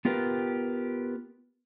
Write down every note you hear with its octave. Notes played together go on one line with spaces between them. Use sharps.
B3 F4 G4 A#4 B4